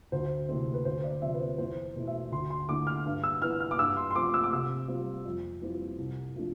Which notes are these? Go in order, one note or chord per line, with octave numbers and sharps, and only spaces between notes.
D2 C5
C3 E3 A3 C4
B4
D2 C5
D5
C3 F3 E5
B4
C5
E2 C5
B2 A3 E4
E5
D2 C6
C6
D3 A3 E4 D6
F6
G2
E6
E3 B3 E4 F6
F6
D6
G2 E6
C6
C6
F3 A3 C4 D6
E6
D6
C3 E6
G3 C4 F4
F2
E3 G3 C4 F4
C2
C3 F3 A3 D4